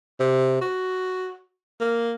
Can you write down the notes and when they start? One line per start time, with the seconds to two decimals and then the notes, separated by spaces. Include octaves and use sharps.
0.20 C3
0.61 F#4
1.80 A#3